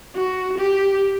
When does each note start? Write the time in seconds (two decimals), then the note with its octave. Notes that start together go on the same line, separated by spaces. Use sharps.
0.15 F#4
0.58 G4